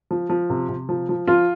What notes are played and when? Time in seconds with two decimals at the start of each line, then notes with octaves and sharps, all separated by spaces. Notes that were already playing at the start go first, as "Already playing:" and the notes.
0.11 F3
0.29 F3
0.50 C3
0.69 C3
0.89 F3
1.09 F3
1.27 F3 F4